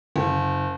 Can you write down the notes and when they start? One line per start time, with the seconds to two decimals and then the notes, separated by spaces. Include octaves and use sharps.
0.16 F#1